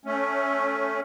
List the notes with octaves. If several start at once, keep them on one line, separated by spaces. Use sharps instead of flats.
A3 C#4